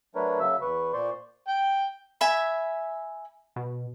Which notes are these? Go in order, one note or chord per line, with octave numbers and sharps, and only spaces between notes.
F#3 A3 D4 A#4 B4 C#5
C#3 F#3 A#3 E5 E6
E2 B4 C#6
A#2 C5 D5 C6 C#6
G5
E5 G#5 B5
B2